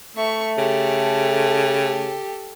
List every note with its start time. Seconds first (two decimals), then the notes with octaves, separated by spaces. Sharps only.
0.15 A3 E5 C#6
0.58 C#3 G4 A4